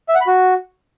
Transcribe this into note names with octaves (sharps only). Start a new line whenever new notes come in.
E5
F#5
B5
F#4